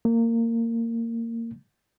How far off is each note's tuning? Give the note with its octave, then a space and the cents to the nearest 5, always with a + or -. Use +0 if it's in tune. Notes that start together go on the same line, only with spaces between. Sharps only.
A#3 -20